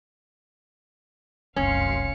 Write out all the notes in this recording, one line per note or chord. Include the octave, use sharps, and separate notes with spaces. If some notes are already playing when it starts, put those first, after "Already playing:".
F1 C2 F#2 C#4 F5 C6 C7 C#7